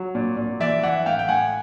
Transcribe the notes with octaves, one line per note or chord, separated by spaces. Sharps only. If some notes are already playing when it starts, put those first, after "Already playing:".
Already playing: F#3
A#2
A#2
E3 D5 E5
E3 E5 F#5
A2 F5 G5
G5
A2 F#5 G#5